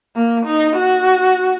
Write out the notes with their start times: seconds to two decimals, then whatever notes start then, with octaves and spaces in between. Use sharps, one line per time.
0.16 A#3
0.46 D#4
0.76 F#4